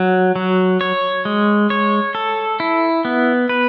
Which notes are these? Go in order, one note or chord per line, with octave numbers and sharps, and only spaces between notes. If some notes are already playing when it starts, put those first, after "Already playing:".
Already playing: F#3
F#3
C#5
G#3
C#5
A4
E4
B3
B4